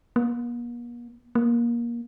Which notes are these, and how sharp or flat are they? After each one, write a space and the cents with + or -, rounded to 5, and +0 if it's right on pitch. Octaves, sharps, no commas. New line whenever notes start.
A#3 +45
A#3 +20